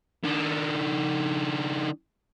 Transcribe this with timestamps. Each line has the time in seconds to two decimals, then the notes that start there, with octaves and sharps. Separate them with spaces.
0.24 D#3 D4